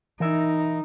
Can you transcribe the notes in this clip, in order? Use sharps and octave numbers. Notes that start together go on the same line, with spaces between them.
E3 D#4 A#4 E5